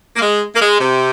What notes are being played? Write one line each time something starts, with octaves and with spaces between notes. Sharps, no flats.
A#3
G#3
A#3
G#3
C3